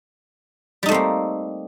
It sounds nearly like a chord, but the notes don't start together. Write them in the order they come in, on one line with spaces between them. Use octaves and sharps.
G3 D#4 A3 C4 A#3